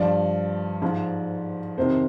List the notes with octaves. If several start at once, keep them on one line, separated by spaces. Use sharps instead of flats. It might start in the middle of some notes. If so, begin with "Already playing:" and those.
Already playing: G2 F3 D5
G#2 F3
F2 C3 D#3 C5